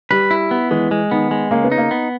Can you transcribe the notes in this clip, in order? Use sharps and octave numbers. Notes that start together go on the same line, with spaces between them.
G3 B4
E4
B3
E3 G#3
G#3
D#3 B3
G#3
C#3 A#3
B3
D#4
A#3
B3